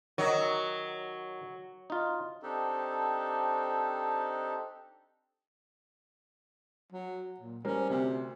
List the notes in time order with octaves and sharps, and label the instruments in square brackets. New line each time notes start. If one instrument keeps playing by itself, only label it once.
[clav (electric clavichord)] D#3 D#5 [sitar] F#3
[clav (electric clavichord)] D#4 F4
[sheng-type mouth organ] C4 D4 D#4 G4 A4
[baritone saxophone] F#3
A#2
[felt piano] G3 A#4 C5 [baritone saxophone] C#4
[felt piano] D2 [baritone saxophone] C3